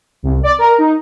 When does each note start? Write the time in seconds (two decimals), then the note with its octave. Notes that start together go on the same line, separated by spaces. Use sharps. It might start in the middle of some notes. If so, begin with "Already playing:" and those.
0.23 C2
0.43 D5
0.58 A#4
0.78 D#4